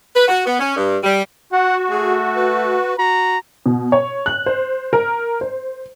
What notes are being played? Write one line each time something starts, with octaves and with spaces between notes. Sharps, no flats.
B4
F#4
B3
C#4
G2
G3
F#4 F#5
A3 G#4
B4
F#4 A#5
B2
C#5
F#6
C5
A#4
C5